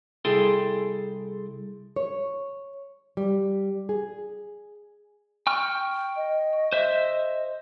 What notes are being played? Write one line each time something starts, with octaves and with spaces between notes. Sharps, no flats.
C2 E4 G#4 A4 G5 C6
C#5
G3
G#4
G5 C#6 F6
D#5
C5 E5